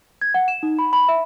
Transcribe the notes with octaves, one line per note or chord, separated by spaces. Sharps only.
G#6
F#5
E7
D#4
B5
B5
E5